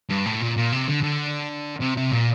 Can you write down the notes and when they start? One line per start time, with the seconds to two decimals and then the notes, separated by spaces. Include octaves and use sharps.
0.09 G2
0.25 A2
0.41 A#2
0.57 A#2
0.72 C3
0.88 D3
1.03 D3
1.81 C3
1.97 C3
2.12 A#2